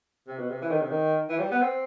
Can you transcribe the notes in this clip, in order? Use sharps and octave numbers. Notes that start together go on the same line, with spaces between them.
C3
B2
C3
E3
D#3
C3
D#3
E3
G3
B3
C4